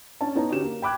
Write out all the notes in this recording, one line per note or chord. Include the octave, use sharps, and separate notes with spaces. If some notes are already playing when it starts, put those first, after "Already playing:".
C#4 D4 C#5 A5
B3 D#4 C#5 A#5
D3 C#4 F#4 G4 E7
A#3
G5 B5 D6 F#6 G#6